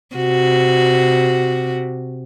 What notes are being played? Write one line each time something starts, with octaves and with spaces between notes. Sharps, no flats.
C3 F#4